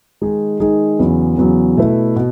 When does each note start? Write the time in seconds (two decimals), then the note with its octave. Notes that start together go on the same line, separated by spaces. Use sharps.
0.22 D#3 G#3 D#4 G#4
0.60 D#3 G#3 D#4 G#4
0.99 E2 C#3 F#3 B3
1.37 E2 C#3 F#3 B3
1.76 B2 A3 E4 B4
2.16 B2